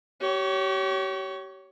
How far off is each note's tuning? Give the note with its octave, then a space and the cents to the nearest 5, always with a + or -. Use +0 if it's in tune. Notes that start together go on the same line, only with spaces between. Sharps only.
G4 -35 C#5 +10